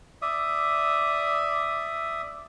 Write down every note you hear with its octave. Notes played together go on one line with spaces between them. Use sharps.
D5 E5 D#6